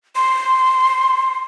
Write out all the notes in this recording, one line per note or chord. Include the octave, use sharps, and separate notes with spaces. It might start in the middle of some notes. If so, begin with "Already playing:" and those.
C6